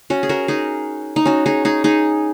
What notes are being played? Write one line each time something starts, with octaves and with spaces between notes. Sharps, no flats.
C#4 F#4
G#4
F#4 A#4
D#4 G#4
D#4
C#4 F#4
D#4 G#4
D#4 G#4
D#4 G#4